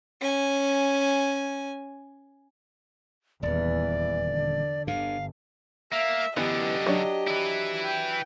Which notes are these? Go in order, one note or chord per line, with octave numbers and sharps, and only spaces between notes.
C#4 G#5
D#1 E2 E3 D5
D3
G1 G2 D3 F5
A#3 E5
F#2 D3 E3 B3 G4 D#5
F#3 D4
E4 B4
G5